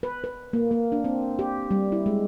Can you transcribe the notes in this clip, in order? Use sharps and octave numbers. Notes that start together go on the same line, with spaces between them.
B4
B4
A#3
A#3
D4
C4
G4
G3
E4
G#3